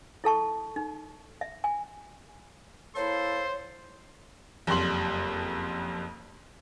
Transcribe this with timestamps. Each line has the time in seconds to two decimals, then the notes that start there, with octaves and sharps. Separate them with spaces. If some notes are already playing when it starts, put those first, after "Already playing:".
0.24 E4 A4 A5 C#6
0.76 D#4
1.41 E5
1.64 G#5
2.96 A#3 E4 A4 C5 C#5 C6
4.67 F#1 F2 G3 C6 F#7